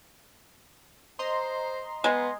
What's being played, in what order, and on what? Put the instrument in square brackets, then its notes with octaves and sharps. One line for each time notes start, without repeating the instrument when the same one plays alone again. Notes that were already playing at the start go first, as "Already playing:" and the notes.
[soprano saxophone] C5 [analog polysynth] D#5 A#5 C6
[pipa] G#3 [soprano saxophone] B3